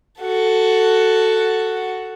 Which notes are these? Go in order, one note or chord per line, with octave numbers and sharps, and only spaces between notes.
F#4 A4